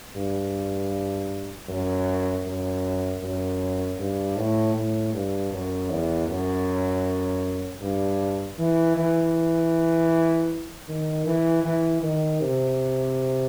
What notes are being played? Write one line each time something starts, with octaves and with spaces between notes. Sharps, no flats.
G2
F#2
F#2
F#2
G2
A2
A2
G2
F#2
E2
F#2
G2
E3
E3
D#3
E3
E3
D#3
C3